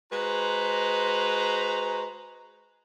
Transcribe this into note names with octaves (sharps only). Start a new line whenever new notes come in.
G#3 F#4 B4 C5 A#5